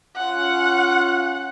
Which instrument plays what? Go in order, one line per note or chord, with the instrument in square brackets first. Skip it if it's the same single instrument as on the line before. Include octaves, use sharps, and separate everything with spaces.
[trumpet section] C#4 F4 [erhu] F#5